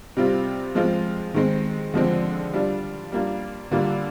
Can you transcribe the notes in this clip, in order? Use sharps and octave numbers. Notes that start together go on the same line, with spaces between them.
C3 G3 C4 F4
F3 G#3 C4 F4
D#3 G#3 C4
D3 F3 G#3 C4
G3 D4 F4
G3 A#3 D4 F4
D3 G3 A#3 F4